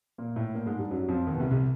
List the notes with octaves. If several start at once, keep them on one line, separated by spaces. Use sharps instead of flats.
A#2 A#3
A2 A3
A#2 A#3
G#2 G#3
G2 G3
F#2 F#3
F2 F3
D#2 D#3
B2
C2 C3
C2 C3